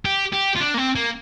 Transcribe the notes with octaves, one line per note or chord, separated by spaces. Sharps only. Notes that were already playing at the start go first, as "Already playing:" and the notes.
G4
G4
F4
D4
A#3
C4
A#3